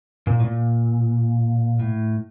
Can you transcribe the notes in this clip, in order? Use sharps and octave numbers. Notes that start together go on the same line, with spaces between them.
A#2
A2
A#2
A2